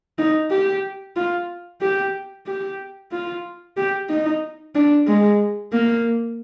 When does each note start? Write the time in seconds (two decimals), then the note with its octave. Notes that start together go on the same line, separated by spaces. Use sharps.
0.18 D#4
0.50 G4
1.16 F4
1.81 G4
2.46 G4
3.11 F4
3.77 G4
4.09 D#4
4.75 D4
5.07 G#3
5.72 A#3